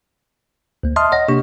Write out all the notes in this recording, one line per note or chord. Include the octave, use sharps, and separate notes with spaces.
D2 A#3
D#5 E5 A5 C6 D#6 F6
C#5 D#5 F#5 A#6
C3 A#3 D4 G4 C#6